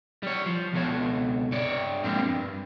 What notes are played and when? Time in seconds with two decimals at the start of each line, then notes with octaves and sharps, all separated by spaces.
0.23 G3 C#5
0.46 F3
0.73 C#2 B2 A4 C#5
1.52 G2 C#5 D5
2.04 F3 G3 G#3 A#3 C4 D4
2.29 G2